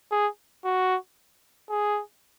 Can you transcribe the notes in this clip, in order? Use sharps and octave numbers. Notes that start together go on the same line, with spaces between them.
G#4
F#4
G#4